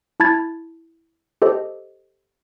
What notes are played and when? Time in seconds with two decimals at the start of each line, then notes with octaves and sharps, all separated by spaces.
0.20 E4 A5 B5 G#6 A6
1.42 G4 A4 C5 D#5